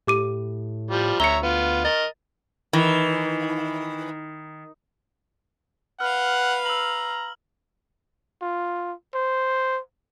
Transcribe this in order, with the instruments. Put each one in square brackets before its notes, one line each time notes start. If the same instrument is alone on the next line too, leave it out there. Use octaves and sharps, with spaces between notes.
[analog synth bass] A2 [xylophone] G4 D6 D#7
[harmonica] F3 G3
[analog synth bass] D2 [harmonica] C#5 E5 A#5 [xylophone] C#7 G7
[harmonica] B3 F4
[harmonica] A#4 D#5 [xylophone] A6
[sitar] D#3 [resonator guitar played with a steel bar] E3
[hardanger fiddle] B4 F5 [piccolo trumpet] F#5 [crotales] F6
[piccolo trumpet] A#5 [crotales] E6 F#7
[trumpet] F4
C5